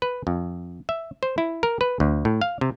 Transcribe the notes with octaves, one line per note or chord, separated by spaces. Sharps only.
B4
F2
E5
C5
E4
A#4
B4
D2
A2
F5
C3